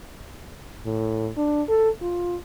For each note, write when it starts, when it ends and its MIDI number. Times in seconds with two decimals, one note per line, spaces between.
0.86 1.29 45
1.37 1.62 62
1.69 1.89 69
2.01 2.37 65